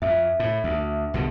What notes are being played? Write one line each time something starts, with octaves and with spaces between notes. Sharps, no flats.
F2 E5
A2
D2
C2 B2 D3